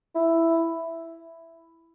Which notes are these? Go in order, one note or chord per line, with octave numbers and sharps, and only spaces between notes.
E4